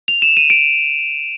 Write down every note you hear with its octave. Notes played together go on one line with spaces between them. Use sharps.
F7
E7
D#7
D7